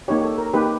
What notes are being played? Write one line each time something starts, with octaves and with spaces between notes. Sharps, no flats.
A#3 D#4 G4 C#5
A4
A#4
A#3 D#4 G4 B4